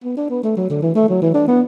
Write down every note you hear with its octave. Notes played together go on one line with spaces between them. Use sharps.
B3
D4
B3
A3
F#3
D3
E3
A3
F#3
E3
D4
B3